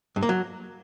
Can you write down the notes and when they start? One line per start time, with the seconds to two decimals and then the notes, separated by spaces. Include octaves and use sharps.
0.16 G2
0.23 A#3
0.29 F#3